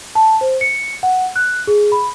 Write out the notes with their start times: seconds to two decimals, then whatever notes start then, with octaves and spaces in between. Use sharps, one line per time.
0.15 A5
0.41 C5
0.61 C#7
1.03 F#5
1.36 F#6
1.67 G#4
1.92 B5